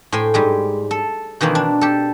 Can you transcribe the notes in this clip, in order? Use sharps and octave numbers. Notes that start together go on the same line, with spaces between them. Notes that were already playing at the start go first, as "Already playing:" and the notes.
A2 C5 G5 G#5
G#2 G3 G#3
A4
B2 D#3 E3 A#3 C4
D4
G4 A4